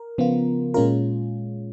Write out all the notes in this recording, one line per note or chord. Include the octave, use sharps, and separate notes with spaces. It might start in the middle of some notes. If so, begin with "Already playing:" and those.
Already playing: A#4
C#3 F3 B3 F4
A#2 G#3 C#4 F4 A#4